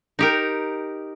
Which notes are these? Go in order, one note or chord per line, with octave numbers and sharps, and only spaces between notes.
D#4 G4 A#4